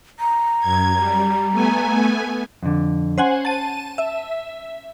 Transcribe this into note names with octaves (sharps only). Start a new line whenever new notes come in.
A#5
F#2 G#6
G3
A3 B3 G#5
F2 D3
C#4 C5 F#5 G#5
A5 D#7
E5